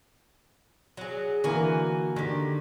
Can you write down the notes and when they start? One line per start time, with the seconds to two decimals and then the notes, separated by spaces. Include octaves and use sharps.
0.97 F#3 G#4
1.44 D3 E3 A#3 F#4 G#5
2.16 D3 D#3 G4